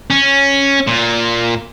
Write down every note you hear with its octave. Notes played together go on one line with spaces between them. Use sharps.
C#4
A#2